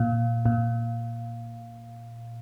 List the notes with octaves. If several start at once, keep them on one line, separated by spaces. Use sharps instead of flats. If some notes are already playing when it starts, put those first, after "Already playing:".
Already playing: A#2
A#2